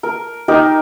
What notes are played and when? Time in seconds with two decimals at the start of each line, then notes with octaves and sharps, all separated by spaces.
0.03 A#4
0.48 D#4 G4 A#4